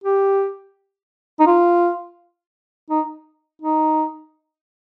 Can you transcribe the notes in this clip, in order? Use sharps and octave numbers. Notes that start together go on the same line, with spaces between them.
G4
D#4
F4
D#4
D#4